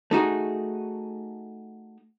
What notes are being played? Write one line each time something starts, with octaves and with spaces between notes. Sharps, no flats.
A3 D#4 F#4 G#4